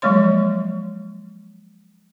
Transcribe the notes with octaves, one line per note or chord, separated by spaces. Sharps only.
F3 F#3 G#3 A#3 C#5 C6